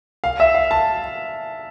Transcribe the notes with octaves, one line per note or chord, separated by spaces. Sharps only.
F5
E5
F5
A5